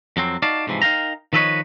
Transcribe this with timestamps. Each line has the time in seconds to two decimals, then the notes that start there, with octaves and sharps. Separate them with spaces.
0.17 F2 F#3 C4
0.42 D#4 F#4 D5 F5 A5
0.67 G#2 C3 E3 F3
0.82 D#4 A#4 F5 G5 A#5
1.33 D#3 F3 A4 B4 C#5 D#5